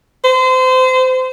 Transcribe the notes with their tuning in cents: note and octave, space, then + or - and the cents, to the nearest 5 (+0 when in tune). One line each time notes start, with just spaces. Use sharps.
C5 -30